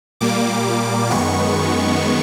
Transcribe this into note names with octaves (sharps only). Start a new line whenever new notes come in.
A#2 G3 A#3 D6
F#2 D#3 G#3 B3 C#6